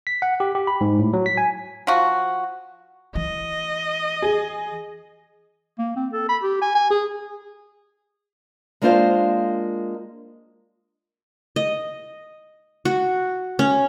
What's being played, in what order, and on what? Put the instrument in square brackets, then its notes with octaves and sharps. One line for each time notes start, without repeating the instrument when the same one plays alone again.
[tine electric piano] B6
F#5
G4
G4
B5
G#2
A2
F#3
B6
G#5
[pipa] F3 F#4
[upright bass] E3 [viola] D#5
[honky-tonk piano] G#4
[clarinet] A#3
C4
A4
B5
G4
G#5
G#5
G#4
[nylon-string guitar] G#3 A#3 D4 F4 C5 F5
[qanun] D#5
F#4
C#4